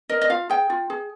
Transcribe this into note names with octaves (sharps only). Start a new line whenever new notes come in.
A#4 D#5
D#5
F4 F5
G#4 G5
F4
G#4